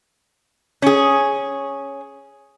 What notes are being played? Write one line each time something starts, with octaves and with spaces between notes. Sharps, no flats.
C#4 G#4